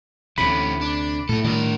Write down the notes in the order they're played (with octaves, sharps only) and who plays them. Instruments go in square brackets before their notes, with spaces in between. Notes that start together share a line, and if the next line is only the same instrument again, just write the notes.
[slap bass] D2 C3 [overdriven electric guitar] E3 C#4 [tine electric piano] B5
[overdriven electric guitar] D4
[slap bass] A2 [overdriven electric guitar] E4 A4
[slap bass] A2 D#3 G3 [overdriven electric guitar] D4 A#4